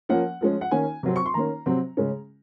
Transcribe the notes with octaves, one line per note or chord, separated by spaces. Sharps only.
F3 A#3 C#4 F#5
F3 G#3 C#4
F#5
D#3 A#3 C#4 G#5
C3 F#3 C4
C#6
C6
D#3 A#3 C#4 A#5
C3 F#3 C4
C#3 G#3 C#4